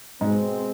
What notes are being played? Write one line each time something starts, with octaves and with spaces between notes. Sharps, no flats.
G#2 B2 G#3 C4